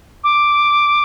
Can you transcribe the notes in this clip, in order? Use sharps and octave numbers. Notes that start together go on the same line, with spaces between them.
D6